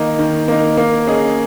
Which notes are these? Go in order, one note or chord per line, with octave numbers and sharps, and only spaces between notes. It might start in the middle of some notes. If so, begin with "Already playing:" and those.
Already playing: D#3 A#3 D#4
D#3
A#3 D#4
A#3
C#4 G#4 D#5